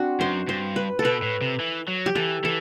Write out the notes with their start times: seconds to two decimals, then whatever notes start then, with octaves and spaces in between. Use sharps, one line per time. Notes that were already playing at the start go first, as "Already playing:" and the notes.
Already playing: C4 D4 F#4
0.20 F#2 C5
0.47 G2 C5
0.76 B4
0.99 A4
1.04 B2 B4
1.23 A2
1.41 C3
1.60 E3
1.88 F#3
2.06 G4
2.16 E3 A4
2.44 E3 A4